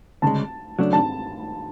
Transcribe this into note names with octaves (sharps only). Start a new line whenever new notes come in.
D2 C#3 G#3 A5
C#3 F#3 A3 D4
A5